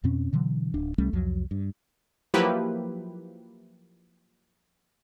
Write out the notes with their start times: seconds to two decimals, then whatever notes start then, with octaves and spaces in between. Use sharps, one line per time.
0.04 F2 B2 C4 C#4
0.33 B2 D3 E3 F#3
0.74 D1 D4
0.98 C2 G3 A3 C#4
1.13 C2 F2 F3 F#3
1.51 G2
2.34 F3 F#3 A#3 E4 G4 B4